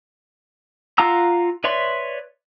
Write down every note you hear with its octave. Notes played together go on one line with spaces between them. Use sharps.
F4 F5 F#5 A#5 E6
B4 C#5 D5 E5 C6